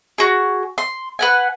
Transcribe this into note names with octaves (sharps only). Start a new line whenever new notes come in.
F#4 G#4
C6
B4 F#5 G#5